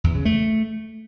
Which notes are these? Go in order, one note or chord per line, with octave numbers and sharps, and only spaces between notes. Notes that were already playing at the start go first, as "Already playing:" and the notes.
E2
C#3
A3